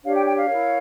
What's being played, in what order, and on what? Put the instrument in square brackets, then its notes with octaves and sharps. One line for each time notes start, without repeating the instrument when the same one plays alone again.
[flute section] D4 G4 C#5 F5
G5
G5
F5
E4 A#4 C#5